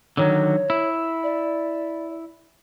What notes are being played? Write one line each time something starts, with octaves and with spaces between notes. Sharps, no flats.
D3 D#3 F#3 C#5
E4
D5